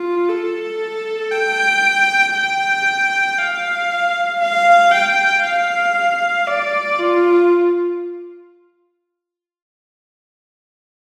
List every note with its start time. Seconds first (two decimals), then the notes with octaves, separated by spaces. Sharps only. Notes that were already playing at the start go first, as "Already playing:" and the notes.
Already playing: F4
0.29 A4
1.32 G5
2.35 G5
3.38 F5
4.40 F5
4.91 G5
5.43 F5
6.47 D5
6.98 F4